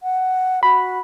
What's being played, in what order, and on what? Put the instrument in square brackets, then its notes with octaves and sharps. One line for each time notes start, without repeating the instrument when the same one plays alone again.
[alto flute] F#5
[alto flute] F#4 [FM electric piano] B5